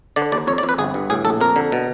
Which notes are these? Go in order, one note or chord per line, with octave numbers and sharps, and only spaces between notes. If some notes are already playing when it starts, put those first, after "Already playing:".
D3 D5
D#2 D5
F2 C#5
D5
F2
B4
G1 G#4
G2
A2 G#4
A#1 A4
F2 A#4
D3
B2